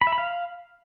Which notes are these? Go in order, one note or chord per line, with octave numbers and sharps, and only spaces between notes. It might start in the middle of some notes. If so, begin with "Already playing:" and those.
B5
E5
B5
F5